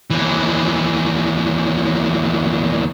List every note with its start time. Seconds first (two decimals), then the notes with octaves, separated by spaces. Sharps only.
0.10 D#2 E3